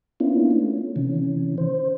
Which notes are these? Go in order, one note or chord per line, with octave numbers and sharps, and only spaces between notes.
A#3 B3 C#4 D4 E4 F4
A3 C#4
C3 D#3 E3 C#4
C5